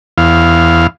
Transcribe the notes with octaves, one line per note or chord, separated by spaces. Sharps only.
E2 F5